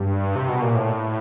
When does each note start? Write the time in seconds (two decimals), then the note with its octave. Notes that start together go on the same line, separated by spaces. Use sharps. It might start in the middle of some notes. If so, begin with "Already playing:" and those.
Already playing: G2
0.36 C3
0.49 B2
0.62 A#2
0.75 A2